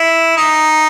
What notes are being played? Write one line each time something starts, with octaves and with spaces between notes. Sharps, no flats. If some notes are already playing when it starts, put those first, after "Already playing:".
Already playing: E4
D#4